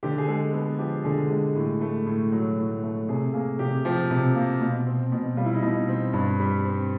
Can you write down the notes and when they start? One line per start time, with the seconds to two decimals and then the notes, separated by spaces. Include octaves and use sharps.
0.03 D3 G4
0.18 G#4
0.28 G#3 A4
0.53 B3 A4
0.79 F3 G4
1.04 D3 G#4
1.29 G#3 G4
1.55 A2
1.81 A3
2.06 A2
2.32 F#3
2.58 A2
2.83 A3
3.08 C3 G#4
3.34 A#3 G#4
3.59 C3 G4
3.85 F3 G4
4.11 C3
4.35 A#3
4.61 B2
4.87 C4
5.12 B2
5.37 G3 F4
5.45 E4
5.54 D#4
5.62 B2 E4
5.88 C4
6.13 G2
6.40 G3
6.65 C4